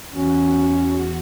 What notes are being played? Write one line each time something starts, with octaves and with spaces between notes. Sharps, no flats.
E2 C#4 F#4